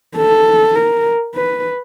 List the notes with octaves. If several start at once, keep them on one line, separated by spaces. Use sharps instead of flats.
A4
A#4
B4